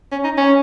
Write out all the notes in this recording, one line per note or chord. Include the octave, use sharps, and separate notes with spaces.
C#4
D#4
C#4